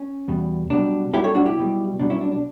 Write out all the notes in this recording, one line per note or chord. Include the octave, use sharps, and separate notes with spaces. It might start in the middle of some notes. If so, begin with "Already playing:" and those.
Already playing: C#4
E2 B2 G3
B1 B2 G3 D4
B1 B2 G3 E4 G4
A4 C#5
D4 F#4
E4 G4
B1 B2 G3
B1 B2 G3 D4
C#4 E4
D4
D4